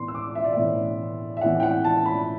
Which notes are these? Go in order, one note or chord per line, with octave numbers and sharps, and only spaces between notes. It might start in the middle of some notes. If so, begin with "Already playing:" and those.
Already playing: A2 E3 B3 C6
E6
D6
E5
D5
A2 E3 B3 E5
E5
A2 E3 B3 F#5
G5
F#5
A5
B5